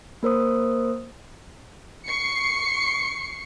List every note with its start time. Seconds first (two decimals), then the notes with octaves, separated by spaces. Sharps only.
0.23 A#3 A#4 C5 D#6
2.06 C#6 C7 C#7